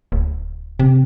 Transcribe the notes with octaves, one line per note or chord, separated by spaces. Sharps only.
D1
C3